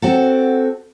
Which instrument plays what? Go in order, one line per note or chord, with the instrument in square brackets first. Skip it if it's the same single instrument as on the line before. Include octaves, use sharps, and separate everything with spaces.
[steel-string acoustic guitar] C4 F#4 A4